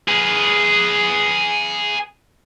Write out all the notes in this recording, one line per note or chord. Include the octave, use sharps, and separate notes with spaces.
G#4 B4